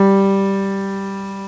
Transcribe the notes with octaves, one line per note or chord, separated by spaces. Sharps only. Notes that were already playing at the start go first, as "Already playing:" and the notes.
Already playing: G3